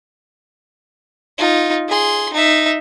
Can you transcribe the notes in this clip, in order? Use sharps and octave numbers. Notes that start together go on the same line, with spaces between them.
D#4 F4
G#4 C6
D#4 E5